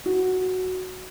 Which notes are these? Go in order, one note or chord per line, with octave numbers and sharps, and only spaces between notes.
F#4